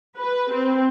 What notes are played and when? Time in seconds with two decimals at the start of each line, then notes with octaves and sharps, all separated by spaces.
0.18 B4
0.53 C4